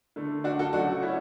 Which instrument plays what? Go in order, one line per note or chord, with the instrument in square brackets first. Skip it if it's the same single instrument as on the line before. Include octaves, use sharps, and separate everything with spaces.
[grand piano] D3 A3
D4 F#4
F#4 A4
C#3 F#3 A3 D4 F#4
C#4 E4